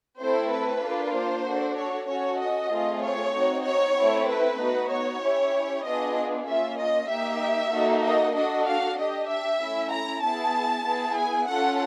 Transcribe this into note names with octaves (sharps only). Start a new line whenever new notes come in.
A3 C4 E4 A4 C5
B4
A#3 D4 F4
C5
D4 F#4 A4
C#5
C#4 F#4 A4 C#5
D#5
A3 C4 F4 G#4
C#5
C4 D#4 F#4
C#5
A3 C4 E4
B4
B3 D#4 F#4
C#5
C#4 E4 G4
B3 D4 F4 G#4 D#5
A#3 C#4 F4 E5
D#5
A#3 D#4 G4 E5
A#3 D#4 F#4 A4
D#5
D4 F#4 A4 D#5
F5
D4 G4 D#5
E5
A3 C#4 E4
A#5
B3 E4 G#4 A5
B3 E4 G#4
G#5
C#4 F4 A4 F#5